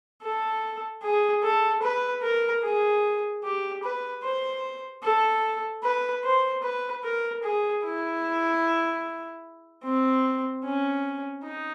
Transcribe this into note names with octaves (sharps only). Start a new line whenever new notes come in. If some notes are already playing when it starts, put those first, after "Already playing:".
A4
G#4
A4
B4
A#4
G#4
G4
B4
C5
A4
B4
C5
B4
A#4
G#4
E4
C4
C#4
D#4